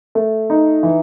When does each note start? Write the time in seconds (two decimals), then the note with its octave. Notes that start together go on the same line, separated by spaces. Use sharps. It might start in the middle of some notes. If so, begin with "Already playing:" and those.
0.15 A3
0.50 D#4
0.83 E3